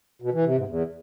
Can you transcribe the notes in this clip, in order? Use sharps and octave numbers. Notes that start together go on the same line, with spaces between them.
B2
E3
C3
G#2
E2